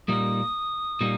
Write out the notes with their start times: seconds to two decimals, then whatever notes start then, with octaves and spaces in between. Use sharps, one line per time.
0.08 A#2 G3 A#3 D#4 D#6
1.01 A#2 G3 A#3 D#4